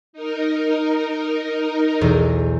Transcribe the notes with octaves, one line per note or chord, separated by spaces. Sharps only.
D#4 A#4
B1 E2